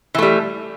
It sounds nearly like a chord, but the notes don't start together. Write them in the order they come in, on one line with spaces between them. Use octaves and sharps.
E3 A3 G3